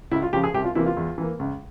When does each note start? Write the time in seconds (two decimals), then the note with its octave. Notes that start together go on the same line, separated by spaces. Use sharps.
0.11 C#2 E4
0.22 F4
0.33 C#3 F3 G4
0.44 G#4
0.54 C2 G4
0.64 F4
0.75 C3 E3 A#3 E4
0.86 F4
0.97 E2
1.18 E3 A#3
1.39 C#2